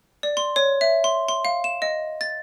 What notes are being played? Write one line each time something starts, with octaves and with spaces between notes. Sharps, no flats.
D5
C6
C#5
E5
C6
C6
F5
E7
D#5
A6